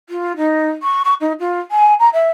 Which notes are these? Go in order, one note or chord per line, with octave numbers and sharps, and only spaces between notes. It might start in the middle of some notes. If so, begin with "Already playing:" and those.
F4
D#4
C#6
C#6
D#4
F4
G#5
A#5
E5